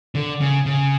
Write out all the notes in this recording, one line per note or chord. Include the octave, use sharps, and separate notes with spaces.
D3
C#3
C#3